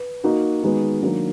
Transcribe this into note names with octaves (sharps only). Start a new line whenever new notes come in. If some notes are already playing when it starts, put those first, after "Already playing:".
Already playing: B4
A#3 D#4 F#4
D#3 G#3 B3 D#4 F#4
D#3 F#3 A#3 D4